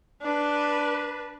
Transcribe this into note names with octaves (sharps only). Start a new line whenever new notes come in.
D4 B4